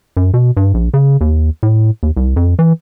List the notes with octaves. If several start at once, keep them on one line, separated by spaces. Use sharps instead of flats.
F#2
B2
G2
A#1
C#3
D#2
A2
D#2
C2
F2
E3